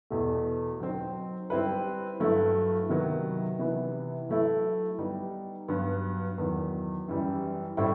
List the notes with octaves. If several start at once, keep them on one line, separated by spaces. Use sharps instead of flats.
E2 B2 A3
F#3 C4 D#4
G3 C4 E4 B4
G2 F#3 A3 E4
C3 D#3 F#3 B3
C3 E3 B3
F#3 A3 E4
G3 B3 D#4
G2 F#3 B3
E2 D#3 F#3
F#2 E3 G3
A2 G3 C4 E4